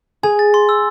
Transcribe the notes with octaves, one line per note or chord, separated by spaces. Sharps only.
G#4 G#5
A6
C6
E6